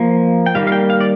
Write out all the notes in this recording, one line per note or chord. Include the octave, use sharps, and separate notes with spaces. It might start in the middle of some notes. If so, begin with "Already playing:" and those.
Already playing: F3 A#3
G5
D#3 G3 A#3 F5
F5
G5
F5
D5